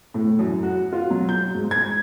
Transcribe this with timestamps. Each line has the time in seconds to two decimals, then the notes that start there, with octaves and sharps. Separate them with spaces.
0.14 A2
0.39 F#2
0.63 F#4
0.92 F4
1.10 F#3
1.29 G6
1.54 G#2
1.71 G#6